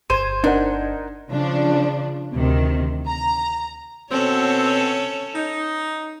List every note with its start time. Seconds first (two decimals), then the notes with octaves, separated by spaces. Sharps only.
0.10 G1 C5 G#6 D#7
0.44 D4 D#4 A#4 F#5
1.29 C#3 F3 D4
2.34 D2 C3 D#3
3.08 A#5
4.11 B2 C4 C#4 A4 C#5
5.35 D#4